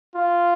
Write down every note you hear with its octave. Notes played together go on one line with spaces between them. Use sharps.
F4